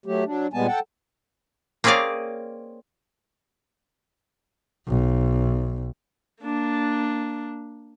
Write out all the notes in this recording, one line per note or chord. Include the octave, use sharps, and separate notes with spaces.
F#3 A3 G4
F#3 D4
A#2 G3 G#3 B3 G#5 A5
A4 F#5 G5 A5
A#3 C4 C#4 G#4 D5 F5
B1
A#3 D4